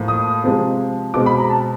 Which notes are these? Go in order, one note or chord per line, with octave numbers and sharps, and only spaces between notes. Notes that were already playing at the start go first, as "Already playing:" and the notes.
Already playing: A2 F3 A#3
D#6
C3 F3 G#3 C4
B2 G#3 C4 D6
B5
A#5
A5